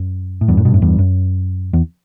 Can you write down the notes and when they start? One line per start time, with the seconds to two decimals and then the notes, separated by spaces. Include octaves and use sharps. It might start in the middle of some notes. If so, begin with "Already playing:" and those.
Already playing: F#2
0.41 A2
0.48 E2 G2
0.57 F#2 A2
0.65 G2 B2
0.74 F#2 A2
0.82 E2 G2
0.99 F#2
1.73 E2